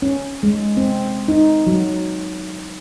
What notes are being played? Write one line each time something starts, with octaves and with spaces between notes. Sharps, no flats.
C#4
G#3
C4
D#4
F#3